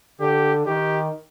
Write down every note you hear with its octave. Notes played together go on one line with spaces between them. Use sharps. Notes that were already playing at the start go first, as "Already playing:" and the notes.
D3 G4
D#3 G4